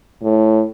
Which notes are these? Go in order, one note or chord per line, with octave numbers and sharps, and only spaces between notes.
A2